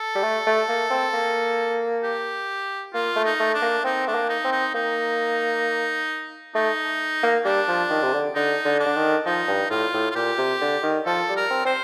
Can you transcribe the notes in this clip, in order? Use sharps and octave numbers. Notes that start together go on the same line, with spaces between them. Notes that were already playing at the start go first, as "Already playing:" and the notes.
Already playing: A4
G3
A3
A3
A#3
C4
A#3
G4
A#3 F4
A3
D#4
A3
D4
A#3
C4 D#4
A3 D4
A#3
D#4
C4
D#4
A#3 D#4
A3 D#4
A#3
G3 D4
F3
D#3
C3
D3
D3 D#4
D3
D4
D3
D#3
F3 D#4
G2
A2 F4
A2
F4
A#2 G4
C3
D3
D#3
F3 A4
G3
A#4
C4
C4 C5